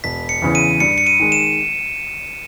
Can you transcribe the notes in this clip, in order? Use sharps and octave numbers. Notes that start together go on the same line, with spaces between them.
E1 B6
C#7
E2 C#3 E3
D#7
G2 C#7
C#7
D#7
D#3 G#3
E7